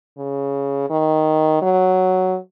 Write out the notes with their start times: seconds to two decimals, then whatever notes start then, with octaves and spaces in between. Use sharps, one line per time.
0.18 C#3
0.90 D#3
1.62 F#3